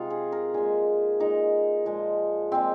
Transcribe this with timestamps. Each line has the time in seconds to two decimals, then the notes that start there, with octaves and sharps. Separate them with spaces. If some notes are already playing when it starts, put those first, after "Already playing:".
Already playing: C3 F3 G#3 D#4 F4
0.10 G#4
0.32 A#4
0.54 A#2 G#3 G#4
1.20 A#2 G#3 D#4
1.86 A#2 F3 G#3
2.52 A#2 F3 G#3 C4